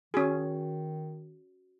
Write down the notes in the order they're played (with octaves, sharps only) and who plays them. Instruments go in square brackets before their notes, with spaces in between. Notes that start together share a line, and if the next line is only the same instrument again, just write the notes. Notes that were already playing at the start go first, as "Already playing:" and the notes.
[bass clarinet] D#3 [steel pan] C#4 G#4 [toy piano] F#4